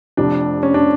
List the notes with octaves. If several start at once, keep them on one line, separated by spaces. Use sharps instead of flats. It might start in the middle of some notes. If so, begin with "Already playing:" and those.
F1 F2 C3 D4
C#4
D4